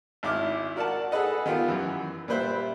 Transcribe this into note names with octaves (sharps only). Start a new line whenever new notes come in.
G#1 E4 D6 F6
F#4 A#4 D5 F#5 A5
G#4 A4 B4 D#5 F#5
D#3 B3 F4 G4
F#2 E3
A#2 G3 B4 C5 E5